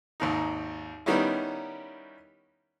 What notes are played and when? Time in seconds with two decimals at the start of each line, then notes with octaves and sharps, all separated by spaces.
0.20 G#1 D#2 D#4
1.06 D#3 G3 B3 C#4 D#4 E4